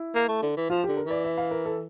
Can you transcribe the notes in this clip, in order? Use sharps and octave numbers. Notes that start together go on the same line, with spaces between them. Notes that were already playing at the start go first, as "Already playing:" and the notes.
Already playing: E4
A#3
A3
D3
E3
F3 F4
D3 G4
A#4
E3 D5
E5
F5
A#4
A4